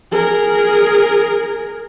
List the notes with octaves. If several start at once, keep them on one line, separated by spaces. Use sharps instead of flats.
G#4 A#4